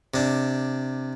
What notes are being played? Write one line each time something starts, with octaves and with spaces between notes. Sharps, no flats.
C3 D4